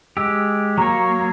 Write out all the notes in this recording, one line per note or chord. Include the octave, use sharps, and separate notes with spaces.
G#3 G4 E6
F#3 A#3 C#5 A#5